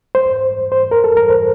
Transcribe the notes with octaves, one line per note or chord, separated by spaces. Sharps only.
C5
C5
A#4
A4
A#4
C5